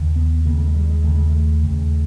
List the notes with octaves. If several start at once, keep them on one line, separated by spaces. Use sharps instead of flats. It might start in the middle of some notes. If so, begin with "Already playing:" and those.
Already playing: D#2 C#3
B3
D#2 C#3 A#3
A3
G#3
G3
G#3
D#2 C#3 A3
G#3
A3
D#2 C#3